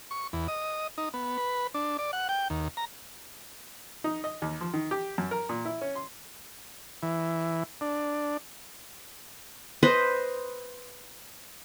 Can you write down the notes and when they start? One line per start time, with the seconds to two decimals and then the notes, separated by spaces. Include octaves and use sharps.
0.11 C#6
0.33 E2
0.48 D#5
0.98 D#4
1.14 B3
1.38 B4
1.74 D4
1.99 D5
2.13 F#5
2.29 G5
2.50 D#2
2.77 A#5
4.04 D#4
4.24 D#5
4.42 D#2
4.61 F3
4.73 D#3
4.91 G4
5.18 F#2
5.31 A#4
5.49 A#2
5.65 E4
5.81 C#4
5.96 C6
7.03 E3
7.81 D4
9.83 B4 C5 D#5